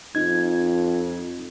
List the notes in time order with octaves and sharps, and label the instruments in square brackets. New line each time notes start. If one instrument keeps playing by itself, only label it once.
[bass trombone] F2 [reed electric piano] D#4 G#6